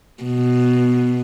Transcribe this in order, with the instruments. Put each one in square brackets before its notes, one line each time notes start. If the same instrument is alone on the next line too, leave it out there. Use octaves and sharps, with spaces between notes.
[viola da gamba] B2